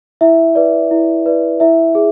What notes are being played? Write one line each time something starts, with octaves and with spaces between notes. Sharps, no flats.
E4 E5
B4 D5
E4
B4 D5
E4 E5
G#4